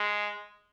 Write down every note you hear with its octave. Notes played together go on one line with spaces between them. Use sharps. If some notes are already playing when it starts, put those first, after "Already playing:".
Already playing: G#3